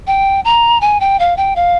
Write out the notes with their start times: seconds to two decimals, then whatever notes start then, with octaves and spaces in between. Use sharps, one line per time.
0.07 G5
0.45 A#5
0.81 G#5
1.00 G5
1.19 F5
1.37 G5
1.56 F5